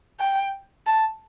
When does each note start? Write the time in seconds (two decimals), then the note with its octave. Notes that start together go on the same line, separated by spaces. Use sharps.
0.19 G5
0.87 A5